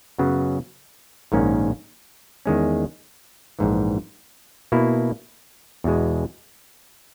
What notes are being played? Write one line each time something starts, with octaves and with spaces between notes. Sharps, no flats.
F#2 C#3 F#3 B3
A#1 G#2 D#3 A#3 C#4
E2 D#3 G#3 C#4
A#1 G#2 E3
B2 A#3 E4
E2 B2 G#3